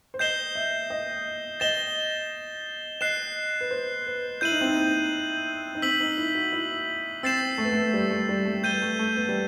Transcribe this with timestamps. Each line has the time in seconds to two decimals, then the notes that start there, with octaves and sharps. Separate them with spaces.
0.14 C5
0.19 D#5 G6 C7 E7 G7
0.55 E5
0.90 D#5
1.60 D#5 A6 E7 G7
3.01 D#5 F#6 C7 E7
3.61 B4
3.71 C5
4.07 B4
4.41 E4 G6 D#7 F#7
4.52 D#4
4.61 C4
4.71 D#4
5.75 D#4
5.82 C4 E6 B6 F#7
6.00 D#4
6.17 E4
6.35 F#4
6.52 E4
7.23 C4 E6 A6 C7 E7
7.58 A3
7.65 B3
7.72 A3
7.94 G3
8.10 A3
8.29 G3
8.45 A3
8.64 G3 G6 D#7 G7
8.73 B3
8.82 A3
8.99 A3
9.16 B3
9.29 G3